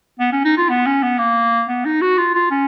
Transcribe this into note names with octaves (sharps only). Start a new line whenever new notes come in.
B3
C#4
D#4
F4
B3
C#4
B3
A#3
B3
D#4
F#4
F4
F4
C#4